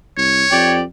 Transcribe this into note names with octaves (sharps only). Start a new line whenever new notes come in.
C2 C#5
F2 G4 D5